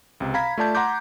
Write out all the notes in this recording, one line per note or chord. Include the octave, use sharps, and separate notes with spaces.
C#2 C3
F5 A#5 B5 G#6 B6
A3 F4 D5 A5 G6
F#5 A#5 C6 D6 G6